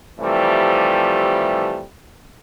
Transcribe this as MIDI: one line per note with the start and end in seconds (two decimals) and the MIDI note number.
0.20 1.83 48
0.20 1.83 52
0.20 1.83 53
0.20 1.83 55
0.20 1.83 57